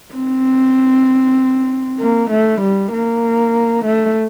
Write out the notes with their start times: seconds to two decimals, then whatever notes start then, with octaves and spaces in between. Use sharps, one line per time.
0.15 C4
2.00 A#3
2.31 A3
2.62 G3
2.93 A#3
3.85 A3